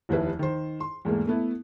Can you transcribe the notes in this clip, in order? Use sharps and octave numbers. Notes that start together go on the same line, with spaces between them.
F1 D#2 E4 B4
D#3 C5
C6
E2 G#2 A3 A#3
A3 B3 E4